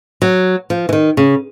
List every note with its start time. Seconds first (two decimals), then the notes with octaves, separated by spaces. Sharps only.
0.22 F#3
0.70 F3
0.89 E3
0.93 D#3
1.17 C#3